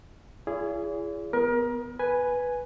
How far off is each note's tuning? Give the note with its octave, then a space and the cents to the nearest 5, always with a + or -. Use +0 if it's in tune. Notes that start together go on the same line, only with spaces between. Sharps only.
E4 +45 G#4 -5 D5 -45
B3 +5 A#4 +30
B4 +0 G#5 +0